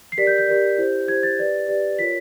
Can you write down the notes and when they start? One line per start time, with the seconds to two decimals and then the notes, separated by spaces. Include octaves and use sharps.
0.12 C7
0.17 G4 A#4 D5 B6
0.27 G6
0.38 G6
0.47 G4 A#4 D5
0.78 E4 G4 C5
1.08 E4 G4 C5 G#6
1.23 A6
1.38 G4 B4 D5
1.68 G4 B4 D5
1.99 F4 A#4 C#5 B6